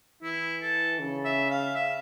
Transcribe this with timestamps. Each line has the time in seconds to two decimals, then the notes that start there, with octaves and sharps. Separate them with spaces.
0.23 E3 E4
0.62 A4
1.00 C#3
1.25 E5
1.50 F5
1.76 E5